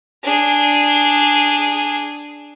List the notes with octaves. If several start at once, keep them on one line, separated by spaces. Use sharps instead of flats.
D4 G#4